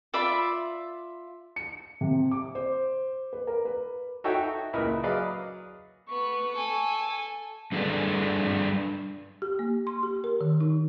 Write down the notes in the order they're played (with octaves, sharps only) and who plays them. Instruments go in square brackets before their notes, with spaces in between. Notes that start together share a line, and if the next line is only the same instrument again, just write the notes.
[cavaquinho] F4 D5 E5 B5
[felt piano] C#7
C3
D6
C5
B4
A#4
B4
[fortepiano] D#4 F#4 A4 C#5 E5 G5
C#2 A#2 E4 A#4 B4 D#5
F#3 G#4 B4 D5 D#5 F5
[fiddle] B3 [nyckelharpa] C#6
[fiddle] A4 G#5
[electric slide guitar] G3 D4 G#4 A4 B4 D5
[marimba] G4
A#3
C6
G4
A#4
D#3
D#4